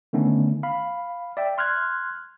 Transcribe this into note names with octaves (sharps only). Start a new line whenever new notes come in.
D3 D#3 A3 B3 C#4
F5 B5
D5 E5 G5
C6 F6 F#6 G#6